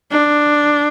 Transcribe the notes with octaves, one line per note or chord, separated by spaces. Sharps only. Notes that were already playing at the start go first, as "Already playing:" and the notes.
D4